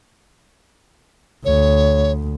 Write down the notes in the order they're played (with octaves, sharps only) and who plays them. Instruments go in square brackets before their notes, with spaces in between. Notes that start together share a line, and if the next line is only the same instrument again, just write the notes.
[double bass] D2 [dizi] C#5